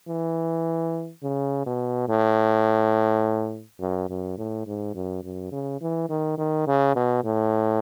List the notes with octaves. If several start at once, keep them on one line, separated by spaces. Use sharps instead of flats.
E3
C#3
B2
A2
F#2
F#2
A2
G#2
F#2
F#2
C#3
E3
D#3
D#3
C#3
B2
A2